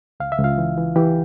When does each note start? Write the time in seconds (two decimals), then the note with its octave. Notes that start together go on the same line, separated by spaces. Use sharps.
0.20 C#2 F5
0.32 E5
0.39 C#2
0.44 F4 F5
0.58 E3
0.77 E3
0.96 E3 G4 G5